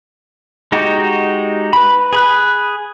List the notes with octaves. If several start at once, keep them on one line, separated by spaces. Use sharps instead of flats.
G#3 D#4 F#4 G4
B4 B5
G#4 B5 F#6